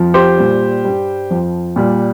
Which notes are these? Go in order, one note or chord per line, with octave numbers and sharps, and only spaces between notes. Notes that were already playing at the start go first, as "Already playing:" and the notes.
Already playing: F2 F3
G4 C5
A#2 G3
G2 G3
F2 F3
A#2 G3